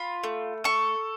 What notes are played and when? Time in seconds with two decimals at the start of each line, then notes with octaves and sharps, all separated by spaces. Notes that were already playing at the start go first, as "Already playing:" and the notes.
Already playing: F4 B5
0.24 A3
0.64 A4 C#6